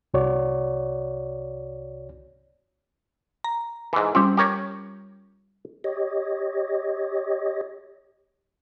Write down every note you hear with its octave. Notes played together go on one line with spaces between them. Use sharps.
C2 F#4 C#5 D5
A#5
G#2 E3
G3 C4 C#4 F4 G4
G4 A#4 C#5
G4 C#5 D#5